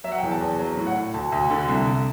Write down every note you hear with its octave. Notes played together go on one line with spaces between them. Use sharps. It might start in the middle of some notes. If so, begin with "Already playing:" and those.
F#3 E5
F#5
G5
E2
A5
E2
F#3
A2
F#5
A2
D2 A5
D2
D3
C2
C2